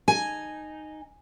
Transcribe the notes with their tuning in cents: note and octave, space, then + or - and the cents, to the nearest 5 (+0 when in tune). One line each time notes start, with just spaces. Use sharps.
D#4 -10 G#5 +0